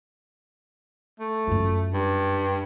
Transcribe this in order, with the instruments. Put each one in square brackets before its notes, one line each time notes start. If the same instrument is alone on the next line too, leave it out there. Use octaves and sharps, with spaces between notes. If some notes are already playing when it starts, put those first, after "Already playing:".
[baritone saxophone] A3
[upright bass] F#2 F4
[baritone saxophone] G2